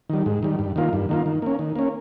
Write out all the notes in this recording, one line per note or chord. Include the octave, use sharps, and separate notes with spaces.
D#3 G3
G#2
D#3 G3
G2
D#3 A#3 F4
G2
D#3 A#3 F4
D#3
A#3 C#4
D#3
A#3 C#4